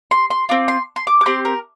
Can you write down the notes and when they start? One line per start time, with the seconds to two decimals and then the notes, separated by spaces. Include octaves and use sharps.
0.11 C6
0.30 C6
0.49 C4 F4 D6
0.68 C6
0.96 C6
1.07 D6
1.21 D6
1.26 C4 G4 C6
1.45 A#4